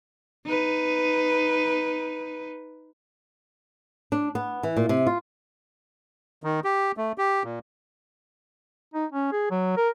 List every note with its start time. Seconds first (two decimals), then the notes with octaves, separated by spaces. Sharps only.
0.46 D#4 B4
4.12 D4
4.35 B3
4.63 E3
4.77 A#2
4.89 C3
5.07 F4
6.44 D#3
6.64 G4
6.97 A3
7.18 G4
7.44 A#2
8.94 D#4
9.12 C#4
9.32 G#4
9.51 F#3
9.77 A#4